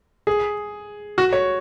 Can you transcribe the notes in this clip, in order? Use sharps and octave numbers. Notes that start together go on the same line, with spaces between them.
G#4
F#4
C#5